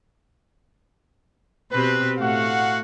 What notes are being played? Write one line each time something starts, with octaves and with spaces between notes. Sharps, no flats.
B2 C4 G4 B4
A2 A3 F#4 F5 F#5